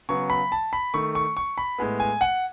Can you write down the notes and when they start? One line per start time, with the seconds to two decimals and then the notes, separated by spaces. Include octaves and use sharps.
0.09 C#3 F#3 B3 C#6
0.30 B5
0.52 A5
0.73 B5
0.94 D#3 A3 C#6
1.15 C#6
1.37 C#6
1.58 B5
1.78 A2 G#3 B3
2.00 G#5
2.21 F#5